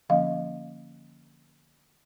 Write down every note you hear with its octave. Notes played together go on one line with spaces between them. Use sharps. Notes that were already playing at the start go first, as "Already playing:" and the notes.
D3 F3 A#3 C#4 D#5 F5